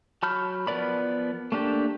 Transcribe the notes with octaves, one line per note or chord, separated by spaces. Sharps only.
F#3 A5 B5 F6 G6
F3 B3 A#4 D5 B5
A3 A#3 D4 G4